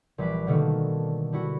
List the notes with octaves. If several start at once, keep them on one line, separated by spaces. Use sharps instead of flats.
A#1 E3 G3 D6 F#6 B6
B2 D3 D#3 A3 A#3
G3 E4 F#4